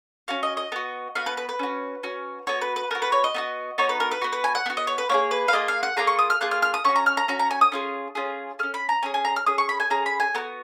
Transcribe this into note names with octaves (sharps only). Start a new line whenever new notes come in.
C#4 F#4 F5
D#5
D#5
B3 F#4
B3 F#4 F5
B4
B4
B4
C#4 F#4
C#4 F#4
B3 F#4 C#5
B4
B4
B3 F#4 A#4
B4
C#5
D#5
B3 D#4 F#4
B3 D#4 F#4 C#5
B4
A#4
B4
B3 F#4
B4
G#5
F#5
B3 F#4
D#5
C#5
B4
A#3 F4 G#4 C#5
B4
F5
A#3 F4 G#4 D#5
F5
F#5
A#3 F4 G#4 A#5
C#6
D#6
F6
A#3 F4 G#4 F#6
F6
F6
D#6
C#4 F#4 C#6
A#5
F6
A#5
C#4 F#4 A#5
A#5
G#5
D#6
C#4 F4 G#4
C#4 F4 G#4
C#4 G#4 F6
B5
A#5
C#4 G#4 G#5
G#5
A#5
F6
C#4 G#4 D#6
C#6
B5
G#5
C#4 G#4 A#5
B5
G#5
B3 F#4 A#4